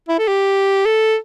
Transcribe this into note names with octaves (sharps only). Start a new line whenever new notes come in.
E4
A4
G4
A4